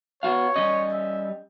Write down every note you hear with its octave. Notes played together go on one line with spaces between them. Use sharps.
B3 F#4 C#5 F5
G3 C#4 D#5
E5